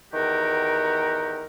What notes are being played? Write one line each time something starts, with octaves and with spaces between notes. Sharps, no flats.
E2 D#3 F#4 G4 A#4